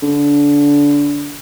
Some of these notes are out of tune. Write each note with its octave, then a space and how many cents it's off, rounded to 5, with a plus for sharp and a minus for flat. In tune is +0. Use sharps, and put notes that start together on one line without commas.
D3 -25